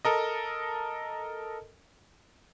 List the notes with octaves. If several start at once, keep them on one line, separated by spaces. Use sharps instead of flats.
A4 A#4 D#5